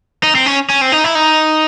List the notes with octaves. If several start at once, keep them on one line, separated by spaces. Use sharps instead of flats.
D#4
C4
C#4
C#4
C4
D#4
E4
D#4